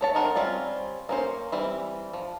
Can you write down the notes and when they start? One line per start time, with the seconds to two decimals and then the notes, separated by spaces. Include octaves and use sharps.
0.01 A4 C#5 A5
0.15 C4 D#4 A#4 C5 F#5
0.36 G3 C4 C#4 F4
1.09 A#3 C#4 C5
1.52 E3 G3 C4
2.13 F3